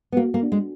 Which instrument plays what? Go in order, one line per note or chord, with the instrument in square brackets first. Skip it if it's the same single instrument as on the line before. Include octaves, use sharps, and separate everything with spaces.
[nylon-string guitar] B3
[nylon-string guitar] A#3 [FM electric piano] F#4
[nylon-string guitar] A#3
[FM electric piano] D4
[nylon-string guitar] G#3